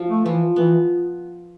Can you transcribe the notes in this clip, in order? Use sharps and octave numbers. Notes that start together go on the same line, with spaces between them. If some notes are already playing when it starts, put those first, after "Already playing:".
Already playing: F3 F4
A3
E3 F3
E3 B3